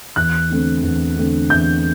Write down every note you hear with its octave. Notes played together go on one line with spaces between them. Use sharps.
E2 F#6
D3 A3 C4
E2
D3 A3 C4
E2 G6